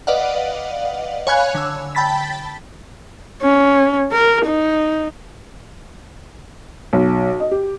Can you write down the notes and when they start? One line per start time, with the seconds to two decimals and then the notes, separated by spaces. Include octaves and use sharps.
0.07 B4 D5 D#5 F5 F#5
1.27 C#5 F5 G#5 B5 F#6 G#6
1.55 D3 E6
1.95 G5 A5 B5 A6 B6
3.42 C#4
4.12 A#4
4.46 D#4
6.93 B1
7.40 D#5
7.51 G4